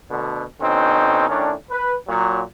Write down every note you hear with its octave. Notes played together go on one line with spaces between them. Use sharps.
D2 B2 D3
B2 D3 C4 C#4 D#4
A2 D#3 C#4 D4
B4
A#2 F#3